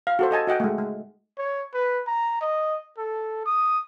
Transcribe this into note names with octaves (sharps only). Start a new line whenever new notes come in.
F5
F#4 A4 C5
A4 D#5 G#5 A5
F#4 D#5 F#5 G5
G#3 A3
G#3
C#5
B4
A#5
D#5
A4
D#6